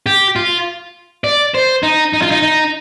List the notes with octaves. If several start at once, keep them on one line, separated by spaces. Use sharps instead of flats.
G4
F4
D5
C5
D#4
D#4
F4
D#4
D#4